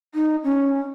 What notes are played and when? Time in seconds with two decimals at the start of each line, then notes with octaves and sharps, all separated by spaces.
0.15 D#4
0.44 C#4